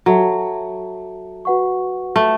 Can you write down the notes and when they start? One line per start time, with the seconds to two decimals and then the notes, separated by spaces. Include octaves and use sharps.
0.06 F#3 F#4 A4 E5 A5
1.45 F#4 B4 F#5 C#6
2.16 A3